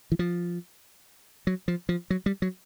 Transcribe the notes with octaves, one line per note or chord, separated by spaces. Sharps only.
E3
F3
F#3
F3
F3
F#3
G3
F#3